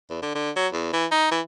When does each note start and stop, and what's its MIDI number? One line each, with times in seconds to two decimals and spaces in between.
0.10 0.19 40
0.22 0.35 50
0.35 0.51 50
0.56 0.67 54
0.73 0.90 40
0.93 1.06 52
1.11 1.29 63
1.31 1.41 52